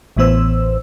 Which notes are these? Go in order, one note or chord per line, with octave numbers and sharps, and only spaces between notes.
A1 A2 E3 B3 C5 E6